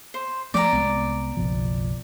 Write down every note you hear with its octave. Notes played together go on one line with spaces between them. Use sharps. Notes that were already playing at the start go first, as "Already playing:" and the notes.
C5
F3 A3 B3 D5 A#5
C2 G#3 B3
F#1 B1 F3